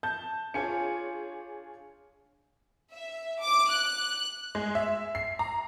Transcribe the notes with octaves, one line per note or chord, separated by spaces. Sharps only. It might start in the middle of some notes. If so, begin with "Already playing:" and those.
A5 G6
D4 F4 G#4 C#5 G#5 C#7
E5
D6
F#6
G#3
E5
C7
A#5